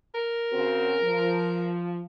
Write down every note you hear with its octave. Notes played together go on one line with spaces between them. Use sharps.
A#4
C#3 C4 F#4
F3